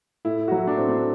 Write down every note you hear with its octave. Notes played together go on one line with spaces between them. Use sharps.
A2 E4
F#3 F#4
E4
D4
A2 C4
D4